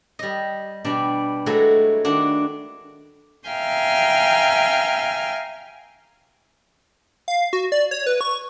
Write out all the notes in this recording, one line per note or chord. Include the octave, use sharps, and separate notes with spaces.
G3 D#5
B2 G3 D4
F#3 G#3 A3 E4 F#4
D#3 D4 F#4
E5 F5 G5 G#5 A#5 F6
F5
F#4
D5
C#5
B4
C#6